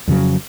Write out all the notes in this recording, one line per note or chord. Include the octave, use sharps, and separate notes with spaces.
F2 C#3 F#3